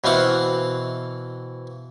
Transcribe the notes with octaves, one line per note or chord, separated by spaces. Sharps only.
B2 E3 C4 F5 F#5